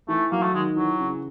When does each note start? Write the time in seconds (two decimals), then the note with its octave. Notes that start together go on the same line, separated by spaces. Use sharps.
0.09 E3 A3
0.32 F#3 A#3
0.43 A3
0.53 D#3 G#3
0.76 E3 F#3
1.00 C#3